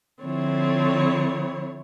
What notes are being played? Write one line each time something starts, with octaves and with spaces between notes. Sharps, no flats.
D3 F3 C4 E4 C#5